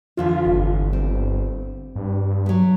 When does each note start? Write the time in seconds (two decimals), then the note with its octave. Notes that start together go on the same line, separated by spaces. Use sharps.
0.17 F2 D3 E3 F4
0.46 G1
0.93 C4
1.95 G2
2.46 B2 F#3